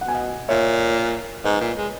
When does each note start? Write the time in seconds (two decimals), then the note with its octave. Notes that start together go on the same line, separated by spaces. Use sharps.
0.01 B2 F#5
0.08 G#5
0.15 D#5 F#5
0.49 A#2 C#5 E5
1.44 G#2 B4 D#5
1.61 A#2
1.77 G#3